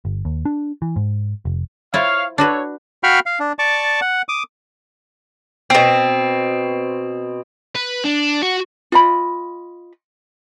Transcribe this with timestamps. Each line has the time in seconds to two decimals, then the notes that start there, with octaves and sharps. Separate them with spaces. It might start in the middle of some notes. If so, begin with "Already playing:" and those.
0.05 G1
0.25 D#2
0.45 D4
0.82 E3
0.96 G#2
1.45 F1
1.94 E4 F4 C5 C#5 F5
2.38 D4 F#4 A4 B4 C#5
3.03 F#4 F5 G5 B5 C#6 F6
3.26 F5
3.40 D4
3.59 D5 A5 C#6 D6
4.01 F#5
4.29 D6 D#6
5.70 B2 C4
7.75 B4
8.05 D4
8.43 F#4
8.92 F4 D#5 B5